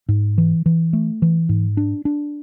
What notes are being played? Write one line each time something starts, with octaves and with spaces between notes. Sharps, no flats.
G#2
E3
E3
A3
E3
G#2
D4
D4